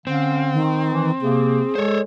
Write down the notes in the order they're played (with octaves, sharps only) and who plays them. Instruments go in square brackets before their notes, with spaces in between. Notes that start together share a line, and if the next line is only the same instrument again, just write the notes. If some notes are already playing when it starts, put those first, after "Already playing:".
[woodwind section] D3 C#4 F5 [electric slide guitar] C4
[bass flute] D#3
[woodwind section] E3
[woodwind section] C3 A#3 [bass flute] G#4
[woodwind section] G#3 A4 [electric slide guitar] C5 C#5